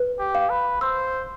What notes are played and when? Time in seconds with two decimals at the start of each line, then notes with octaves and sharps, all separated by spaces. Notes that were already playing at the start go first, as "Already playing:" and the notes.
Already playing: B4
0.19 G4
0.35 F5
0.50 B4
0.81 C5 E6